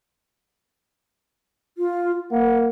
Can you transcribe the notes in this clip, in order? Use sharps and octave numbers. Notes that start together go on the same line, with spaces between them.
F4
A#3 F#5